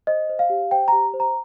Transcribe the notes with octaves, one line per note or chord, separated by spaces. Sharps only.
C5 D#5
C5
F5
G4
C5 G5
G4 A#5
C5
A#5